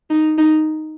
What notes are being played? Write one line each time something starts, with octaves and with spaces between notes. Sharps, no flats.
D#4
D#4